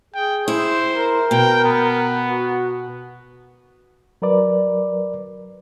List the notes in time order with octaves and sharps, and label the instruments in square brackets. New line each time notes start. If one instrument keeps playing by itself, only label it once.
[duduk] G#4 [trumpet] G5
[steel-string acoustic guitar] E4 [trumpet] C5
[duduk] A#4
[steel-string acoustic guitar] B2 [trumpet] G5
[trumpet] B3
[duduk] F#4
[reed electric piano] F#3 A#4 B4 D5